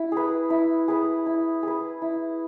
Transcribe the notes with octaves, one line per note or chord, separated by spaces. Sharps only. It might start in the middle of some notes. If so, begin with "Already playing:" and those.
Already playing: E4
G#4 B4
E4
G#4 B4
E4
G#4 B4
E4